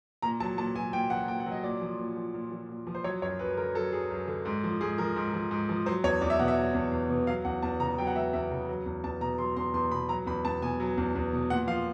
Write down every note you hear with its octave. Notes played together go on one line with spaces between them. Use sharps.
A#2 A#5
F#3 A5
A#2 A5
F#3 G#5
A#2 G5
F#3 F#5
A#2 G5
F#5
F#3
D#5
A#2 D5
F3
A#2
F3
A#2
F3
A#2
F3
C5
F#3 C#5
F#2 C#5
F#2 B4
D3 A#4
F#3 A4
F#2 G#4
F#2
D3
G#2
F3
G#2 G#4
F3 A#4
G#2
F3
G#2
F3
F#3 C5
E2 C#5
E2 D5
E5
B2 F#5
E5
F#3
E2
E2
B2
F#3 F5
E2 F#5
E2 A5
C#3 A#5
F#3 G5
F#5
E2 E5
E2 E5
C#3
F#3
E2
E2 A5
B2 A#5
F#3 C6
E2 C6
E2 C6
B2 B5
F#3 A#5
E2 B5
E2 A5
B2 G#5
F#3
E2
E2
B2
A#2 F#5
F3 F5